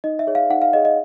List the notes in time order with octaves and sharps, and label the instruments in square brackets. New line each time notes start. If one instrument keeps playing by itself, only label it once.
[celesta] D#4 D#5
E5
G#4 C#5
F5
D#4 F#5
F5
G#4 C#5 D#5
D#5